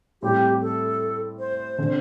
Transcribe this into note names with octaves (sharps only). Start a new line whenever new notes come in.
A2 G3 C4 E4 G4
A4
C5
D3 C4